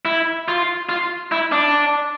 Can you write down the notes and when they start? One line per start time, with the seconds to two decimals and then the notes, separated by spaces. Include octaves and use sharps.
0.05 E4
0.48 F4
0.89 F4
1.32 E4
1.52 D4